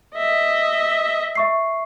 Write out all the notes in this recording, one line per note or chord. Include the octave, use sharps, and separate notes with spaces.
D#5 E5
E5 C#6 C7